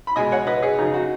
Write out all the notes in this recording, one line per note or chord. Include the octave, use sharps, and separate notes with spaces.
B5
B2 G#3 D#5 G#5
C#5 F#5
B4 D#5
G#4 C#5
C#3 F#3 D#4
F#4